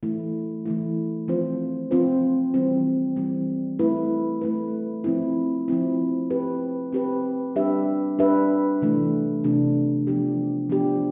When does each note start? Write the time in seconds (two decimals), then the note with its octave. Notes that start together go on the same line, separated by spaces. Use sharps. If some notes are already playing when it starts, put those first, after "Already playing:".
0.03 E3 A3 E4
0.66 E3 A3 E4
1.28 F3 C4 F4 C5
1.91 F3 C4 F4 C5
2.54 E3 G3 C4
3.16 E3 G3 C4
3.79 A3 E4 B4
4.41 A3 E4 B4
5.04 F3 C4 E4
5.68 F3 C4 E4
6.30 C4 G4 B4
6.93 C4 G4 B4
7.56 G3 D4 G4 B4 E5
8.19 G3 D4 G4 B4 E5
8.81 C3 E3 A3 D4
9.44 C3 E3 A3 D4
10.07 F3 B3 D4 G4
10.70 F3 B3 D4 G4